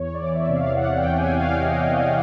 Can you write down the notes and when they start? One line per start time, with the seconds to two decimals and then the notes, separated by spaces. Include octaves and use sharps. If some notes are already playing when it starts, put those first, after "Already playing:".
Already playing: E2 C#5
0.14 D5
0.21 E3
0.35 E5
0.49 C3
0.56 F5
0.77 E2 F#5
0.98 G5
1.04 E2
1.18 G#5
1.33 E3
1.40 F5
1.61 C3 D#5
1.88 E2 D#5